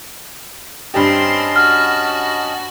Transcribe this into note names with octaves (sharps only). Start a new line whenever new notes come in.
G2 C4 C#4 G4 D#5 A5 C6
F#4 F6